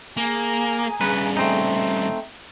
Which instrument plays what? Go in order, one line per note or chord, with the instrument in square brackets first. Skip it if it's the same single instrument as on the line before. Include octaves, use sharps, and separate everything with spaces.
[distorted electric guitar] A#3 [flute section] G#4 G#5 A#5
[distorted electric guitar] G2 C#3 [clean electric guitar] B4
[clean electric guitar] A3 C4 D#4